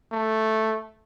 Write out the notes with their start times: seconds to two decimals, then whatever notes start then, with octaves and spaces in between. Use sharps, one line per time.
0.12 A3